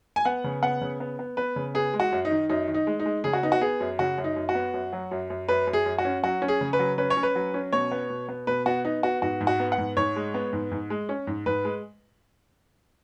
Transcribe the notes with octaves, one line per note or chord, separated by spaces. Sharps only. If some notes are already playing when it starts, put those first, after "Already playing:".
G#5
B3 F#5
C#3
B3 F#5
C#3
B3
B3
B3 B4
C#3
B3 G#4
G#3
F#4
F#2
D#4
D#3
F#2 D#4
D#3
D#4
G#3
D#4
G#3
C#3 G#4
F#4
B3 D#4
F#4
B3 G#4
F#2
C#3 F#4
F#2
D#4
F#2
F#4
B3
F#2
F#3
F#2
F#2
F#2 B4
F#2
G#4
F#2
F#4
C#4
F#3 F#4
C#4
G#4
C#3
B4
F#3
C#4 B4
C#5
C#4
B4
F#3
C#4
B2 C#5
B3
B2
B3
B2 B4
B3 F#4
B3 D#4
B3 F#4
G#2 F#4
G#2
F#4
B3
F#5
G#2
G#2 C#5
G#3
B3
G#2
G#2
G#3
C#4
G#2
G#2 B4
G#3